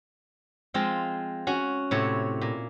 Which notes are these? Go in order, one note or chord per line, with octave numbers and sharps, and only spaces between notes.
F3 G#3 C4 F4
C#4 F#4
A2 C3 E4 C#5
A#2